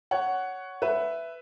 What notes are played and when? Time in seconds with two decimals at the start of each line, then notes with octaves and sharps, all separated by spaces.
0.11 C#5 F#5
0.82 B4 E5